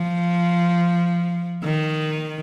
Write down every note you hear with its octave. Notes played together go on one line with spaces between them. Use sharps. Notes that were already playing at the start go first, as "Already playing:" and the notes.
Already playing: F3
D#3